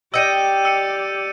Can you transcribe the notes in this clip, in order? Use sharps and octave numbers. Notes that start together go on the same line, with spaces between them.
G4 D5 D#5 G5 E6 C#7 D#7
E6 C#7 D#7